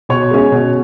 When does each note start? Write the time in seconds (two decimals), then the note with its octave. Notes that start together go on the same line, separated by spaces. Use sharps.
0.09 B2 C#5
0.31 G#3 C#4
0.52 B2